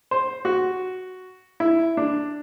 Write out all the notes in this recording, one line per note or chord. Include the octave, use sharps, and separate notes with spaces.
C5
F#4
E4
D4